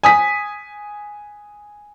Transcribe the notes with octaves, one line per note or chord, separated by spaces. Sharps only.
G#5 D#6 B6